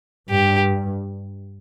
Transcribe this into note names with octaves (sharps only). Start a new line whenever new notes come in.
G2 G4